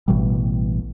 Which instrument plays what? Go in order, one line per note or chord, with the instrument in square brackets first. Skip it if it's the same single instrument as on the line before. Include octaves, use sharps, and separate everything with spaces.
[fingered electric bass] A1 B2 E3 G3